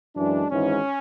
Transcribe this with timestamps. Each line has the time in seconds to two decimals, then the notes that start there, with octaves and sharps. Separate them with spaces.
0.16 F#2 E3 G#3 D4
0.50 G#1 G#2 E3 C#4